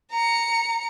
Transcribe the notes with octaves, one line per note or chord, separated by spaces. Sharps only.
A#5 C#7